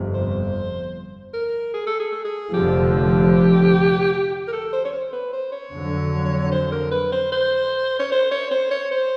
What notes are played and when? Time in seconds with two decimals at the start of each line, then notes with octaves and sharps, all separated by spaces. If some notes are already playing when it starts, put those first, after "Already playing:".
Already playing: G1 F2 C3
0.14 C5
1.34 A#4
1.74 G#4
1.87 A4
2.00 G#4
2.12 A4
2.25 G#4
2.53 F1 F2 D3 F3 G4
4.13 G4
4.48 A#4
4.53 A4
4.73 C5
4.85 C#5
4.93 C5
5.13 B4
5.33 C5
5.52 C#5
5.72 F2 D3 F#3
6.52 C5
6.72 A#4
6.92 B4
7.12 C5
7.32 C5
7.99 C#5
8.12 C5
8.32 C#5
8.51 C5
8.71 C#5
8.91 C5